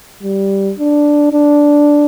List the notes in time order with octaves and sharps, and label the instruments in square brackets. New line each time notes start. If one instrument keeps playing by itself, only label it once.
[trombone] G3
D4
D4